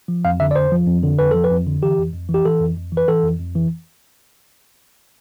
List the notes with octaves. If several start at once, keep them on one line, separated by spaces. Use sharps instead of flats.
F3
F2 F5
D3 E5
D5
F2 C5
F3
F2
D3
F2 B4
F3 A4
B4
F2
D3
E3 G4
F2
F2
E3 G4
E3 A4
F2
F2
E3
B4
E3 A4
F2
F2
E3